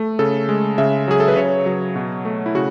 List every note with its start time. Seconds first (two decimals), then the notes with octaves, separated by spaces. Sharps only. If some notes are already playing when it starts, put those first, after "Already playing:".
Already playing: A3
0.19 C#3 A4
0.49 G#3
0.78 C#3 E5
1.08 F#3 G#4
1.20 A4
1.28 B4
1.36 C#3 C#5
1.66 F#3
1.96 B2
2.25 A3
2.46 E4
2.55 C#3 F#4